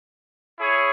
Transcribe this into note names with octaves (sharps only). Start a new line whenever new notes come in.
E4 G#4 C#5